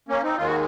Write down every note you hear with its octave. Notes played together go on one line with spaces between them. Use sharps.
A#3 C#4
C4 D#4
D#2 D#3 G#3 F4
F#4